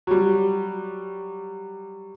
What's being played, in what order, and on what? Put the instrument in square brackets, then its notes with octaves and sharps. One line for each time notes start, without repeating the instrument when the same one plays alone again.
[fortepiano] F#3 G3